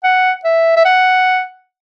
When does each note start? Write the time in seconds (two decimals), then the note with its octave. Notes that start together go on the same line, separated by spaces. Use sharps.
0.04 F#5
0.44 E5
0.76 E5
0.85 F#5